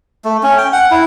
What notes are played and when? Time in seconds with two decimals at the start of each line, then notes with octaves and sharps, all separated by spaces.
0.25 A3
0.43 C#4
0.58 G5
0.73 F#5
0.91 E4